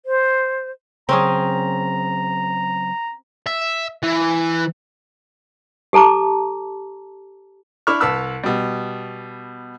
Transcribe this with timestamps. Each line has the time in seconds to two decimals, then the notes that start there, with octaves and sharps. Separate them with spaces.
0.06 C5
1.09 C#3 F#3 C4 C#4 G#4 A#5
3.47 E5
4.03 E3
5.93 G4 A4 A5 A#5 D6
7.87 D4 E4 B5 C#6 D6 F6
8.01 C2 B4 A5 B5 E6 F6
8.44 B2 G3